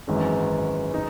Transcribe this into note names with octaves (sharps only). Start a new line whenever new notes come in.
G#1 F#2 E3 G#3 C#4
D#4